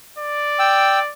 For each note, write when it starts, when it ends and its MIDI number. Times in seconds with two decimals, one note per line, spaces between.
0.19 1.13 74
0.59 0.99 79
0.59 0.99 88